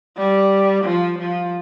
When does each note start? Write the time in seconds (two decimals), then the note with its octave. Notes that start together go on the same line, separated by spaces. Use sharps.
0.18 G3
0.84 F3
1.19 F3